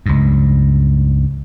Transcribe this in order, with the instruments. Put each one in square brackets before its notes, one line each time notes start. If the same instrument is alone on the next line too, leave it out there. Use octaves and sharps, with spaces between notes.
[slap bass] C#2 G2